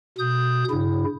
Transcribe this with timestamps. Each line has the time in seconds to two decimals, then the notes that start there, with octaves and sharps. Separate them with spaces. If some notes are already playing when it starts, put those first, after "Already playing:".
0.18 B2 D#6 G6
0.70 G2 C#3 E4